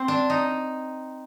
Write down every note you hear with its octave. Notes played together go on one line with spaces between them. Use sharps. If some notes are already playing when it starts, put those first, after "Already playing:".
Already playing: C4
D4
D#4